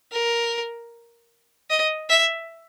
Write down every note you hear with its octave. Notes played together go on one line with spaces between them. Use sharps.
A#4
D#5
E5